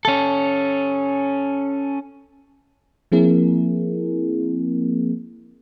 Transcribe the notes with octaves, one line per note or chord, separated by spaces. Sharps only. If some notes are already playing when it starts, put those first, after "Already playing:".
C#4 A4
F3 A#3 C4 E4 G#4 A#4